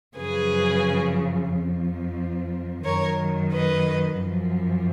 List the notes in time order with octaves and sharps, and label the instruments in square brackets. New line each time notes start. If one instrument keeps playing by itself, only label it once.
[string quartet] F#2 C#3 F3 G#4 B4
F2 F3
F#2 D#3 A#4 C#5
B4 D#5
F#2 F3